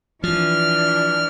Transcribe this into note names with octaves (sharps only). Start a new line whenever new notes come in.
E3 F3 D4 F6